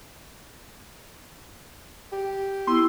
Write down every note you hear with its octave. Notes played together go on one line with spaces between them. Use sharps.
G4
B3 E4 C6 E6